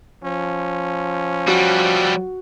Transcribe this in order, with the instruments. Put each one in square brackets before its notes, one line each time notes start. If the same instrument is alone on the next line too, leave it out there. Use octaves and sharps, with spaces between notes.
[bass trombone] F3 [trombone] C#4
[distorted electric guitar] F#3 G3 [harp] F#4